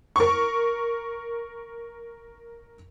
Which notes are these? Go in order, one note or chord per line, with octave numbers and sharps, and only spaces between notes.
A#4 C#6